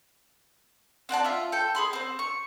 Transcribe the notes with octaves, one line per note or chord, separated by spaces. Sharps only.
C4 F#4 D5 A5
F4 E5
A4 G5
G#4 B5 C6
C4 C5
C#6